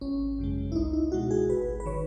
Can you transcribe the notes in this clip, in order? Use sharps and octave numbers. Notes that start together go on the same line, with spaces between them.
G#1 C#4
F#2 C#3 G#3
E4
C#2 D#4
E4
B2 G#3 F#4
G#4
G#1 B4
B4
D#3 C#5